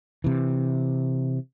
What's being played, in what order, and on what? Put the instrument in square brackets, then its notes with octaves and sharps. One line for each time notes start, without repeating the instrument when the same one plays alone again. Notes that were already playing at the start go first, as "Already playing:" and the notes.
[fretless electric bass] C3 E3